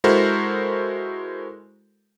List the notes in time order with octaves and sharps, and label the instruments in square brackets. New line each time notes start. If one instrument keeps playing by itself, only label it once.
[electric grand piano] G#3 E4 F#4 A4 A#4 C5